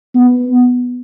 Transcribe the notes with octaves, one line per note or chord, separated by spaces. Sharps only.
B3